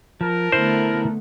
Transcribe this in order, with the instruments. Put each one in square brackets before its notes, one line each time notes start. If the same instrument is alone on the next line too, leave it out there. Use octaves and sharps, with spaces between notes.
[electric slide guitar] F3 [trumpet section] A#4 A5
[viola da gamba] D3 A3 B3 [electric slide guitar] E4 [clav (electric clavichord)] C5